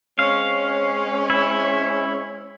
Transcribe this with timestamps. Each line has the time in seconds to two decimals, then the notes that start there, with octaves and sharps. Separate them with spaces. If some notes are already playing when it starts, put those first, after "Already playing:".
0.19 G#3 C4 C#4 F5
1.30 E4